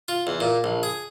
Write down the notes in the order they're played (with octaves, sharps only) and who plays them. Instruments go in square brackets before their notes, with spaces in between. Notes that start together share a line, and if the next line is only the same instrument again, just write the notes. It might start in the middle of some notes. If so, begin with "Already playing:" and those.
[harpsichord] F4
E2
A#2
A#1
G#4